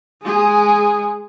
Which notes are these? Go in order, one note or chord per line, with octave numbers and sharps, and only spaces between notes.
G#3 G#4